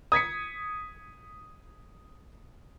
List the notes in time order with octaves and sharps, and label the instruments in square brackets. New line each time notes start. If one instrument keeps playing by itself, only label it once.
[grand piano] D#6 G#6 B6 C#7